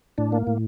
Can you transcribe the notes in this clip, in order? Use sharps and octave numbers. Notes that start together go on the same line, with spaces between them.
A2 D4
A#3
A2